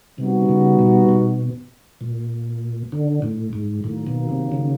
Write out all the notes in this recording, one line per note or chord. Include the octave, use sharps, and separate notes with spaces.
C3 G3 B3 D#4 F#4
C#3
B2
B2
A#2
D3
A2
G#2
A2 D#3 F#3 A#3
B2
C3
C#3